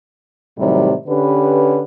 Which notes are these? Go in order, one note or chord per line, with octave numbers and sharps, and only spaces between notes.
A2 C3 D#3 F#3 G3
D3 C#4 G4 B4